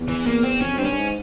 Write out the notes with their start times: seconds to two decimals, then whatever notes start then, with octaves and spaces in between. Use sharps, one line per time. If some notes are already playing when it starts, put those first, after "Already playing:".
Already playing: E2
0.09 E3
0.26 A#3
0.44 C4
0.61 F2 C#4
0.73 F2
0.78 G2 C4
0.85 C#4
0.91 G2
0.97 G#2